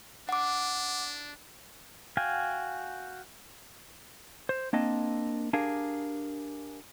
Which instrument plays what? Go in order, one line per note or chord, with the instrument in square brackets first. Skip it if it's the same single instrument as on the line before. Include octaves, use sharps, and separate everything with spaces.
[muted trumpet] D4 [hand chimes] F#5 D6
[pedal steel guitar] F#4 F5 G5 G#5
[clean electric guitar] C5
A#3 C4 D4 D#5
D4 G4 G#4 A#4 F5